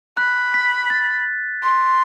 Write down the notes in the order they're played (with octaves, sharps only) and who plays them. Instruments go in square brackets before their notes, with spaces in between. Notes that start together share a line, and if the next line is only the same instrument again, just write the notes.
[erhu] B5 [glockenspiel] F#6
[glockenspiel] B6
A6
[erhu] C6